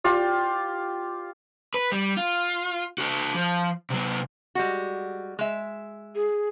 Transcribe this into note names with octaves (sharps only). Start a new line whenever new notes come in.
F4 G4
B4
G3
F4
F#4 A4
F3
C3 F#3
G3 G#3 F#4
G#3 E5
G#4